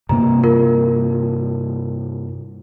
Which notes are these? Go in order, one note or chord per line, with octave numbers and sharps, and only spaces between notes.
G2 C3 A#3 A#5
F4 A#4